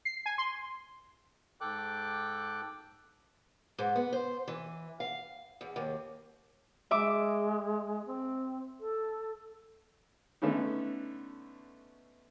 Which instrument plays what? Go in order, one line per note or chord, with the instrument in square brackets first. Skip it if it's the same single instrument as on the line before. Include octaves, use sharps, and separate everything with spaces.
[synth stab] C7
G#5
C6
[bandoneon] G#2 A4 G5 D6 F#6
[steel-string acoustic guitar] G#2
B3
C5
E3
F5
E2
D#2
[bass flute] G#3 [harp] E5 D6
[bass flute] C4
A4
[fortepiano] D3 A3 B3 C#4 D#4